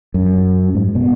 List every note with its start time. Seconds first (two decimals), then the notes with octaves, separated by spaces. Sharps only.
0.14 F#2
0.75 G#2
0.95 B2